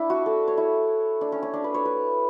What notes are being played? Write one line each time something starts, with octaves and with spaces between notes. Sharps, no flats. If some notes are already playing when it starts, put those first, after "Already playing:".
Already playing: D4 E4
F#4
A4
C#5
E4
D4
C#4
C#4
D4
B4
C#5
B4